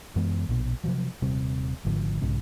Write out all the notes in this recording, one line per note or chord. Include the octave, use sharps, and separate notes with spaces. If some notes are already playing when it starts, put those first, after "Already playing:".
F#2 E3 G#3 B3
A#1 B2
C3 F3 F#3
D#1 C3 G3 C4
G#1 G#2 D3 F3
B1 G#2 C#3